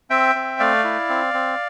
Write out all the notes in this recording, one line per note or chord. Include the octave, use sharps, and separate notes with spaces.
C4 E5 G5
C4
A3 D5 F5
E4
C4
C4